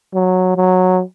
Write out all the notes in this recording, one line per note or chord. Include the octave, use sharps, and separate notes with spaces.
F#3
F#3